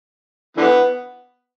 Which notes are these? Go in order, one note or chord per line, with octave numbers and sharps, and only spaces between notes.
D3 E3 B3